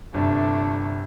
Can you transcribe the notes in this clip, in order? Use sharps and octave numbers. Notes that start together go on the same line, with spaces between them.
G1 C3 A3 D4